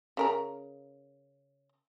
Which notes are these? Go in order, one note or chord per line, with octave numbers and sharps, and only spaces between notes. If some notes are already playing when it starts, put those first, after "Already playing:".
C#3 A#4 A#5